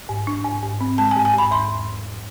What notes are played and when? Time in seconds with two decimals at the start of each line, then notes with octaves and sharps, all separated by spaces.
0.09 G#2
0.27 D4
0.45 G#2
0.63 G#2
0.81 C4
0.98 G#3 A5
1.11 G#2 G#5
1.25 G#5
1.34 G#2 B5
1.51 E2 C6